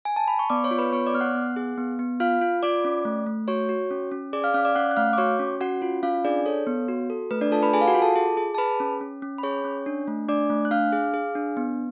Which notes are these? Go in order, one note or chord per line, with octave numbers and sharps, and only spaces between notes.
G#5
A5
B5
C#6
B3 D5 D6
C#5 C#6
F4
B4 B5
B3 C#5 C#6
D5 D6
B3 F6
F#5 F#6
B3
G#4
B3
B3
F4 F5 F6
F4
F4 D5 D6
C#4
A3
A3
F#4 C#5 C#6
F#4
C#4
C#4
G#4 D5 D6
F5 F6
C#4 F5 F6
D5 D6
C#4 F#5 F#6
F#6
A3 F5 F6
D6
F#4 C#5 C#6
C#4
C#4 F#4 F#5
F4
C#4 F4 F5
D4 G#4 D5
A4 C#5
B3
F#4
A4
A3 B4
D4 D5
F4 A4 A5
B4 B5
G#4 G#5
F5
F#4 F#5
F4
A4 A5
G#4
G#4
A5
G#4 B4 B5
C#4
C#4
C#4
B5
G#4 C#5 C#6
C#4
D4
A3
D4 D5 D6
A3
F#6
D4 F5 F6
G#4
G#4
D4
B3